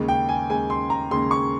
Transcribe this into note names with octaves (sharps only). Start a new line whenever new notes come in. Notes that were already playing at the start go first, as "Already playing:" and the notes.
Already playing: D#2 C#3 G#3
G5
G#5
D#2 C#3 G#3 G#5
C6
A#5
D#2 C#3 G#3 C6
C#6